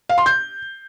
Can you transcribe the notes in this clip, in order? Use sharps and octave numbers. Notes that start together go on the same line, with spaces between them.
F5
C6
G6